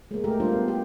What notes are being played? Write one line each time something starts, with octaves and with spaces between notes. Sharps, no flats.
G#3 A#3
A3 G4 A#4
G3 A#3 D4 F4 C5
B3
G4